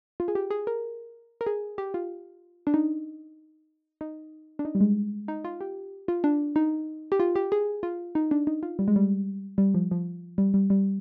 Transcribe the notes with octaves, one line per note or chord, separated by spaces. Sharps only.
F4
G#4
G4
G#4
A#4
A#4
G#4
G4
F4
D4
D#4
D#4
D4
D#4
G3
G#3
D#4
F4
G4
F4
D4
D#4
G4
F4
G4
G#4
F4
D#4
D4
D#4
F4
G3
G#3
G3
G3
F3
F3
G3
G3
G3